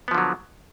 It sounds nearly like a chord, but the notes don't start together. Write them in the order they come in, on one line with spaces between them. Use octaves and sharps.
B3 F3 D3 F#3